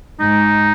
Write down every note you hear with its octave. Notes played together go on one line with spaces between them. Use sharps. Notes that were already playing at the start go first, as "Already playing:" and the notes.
G#2 D#4